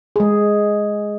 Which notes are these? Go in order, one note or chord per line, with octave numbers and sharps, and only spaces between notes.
G#3 G#4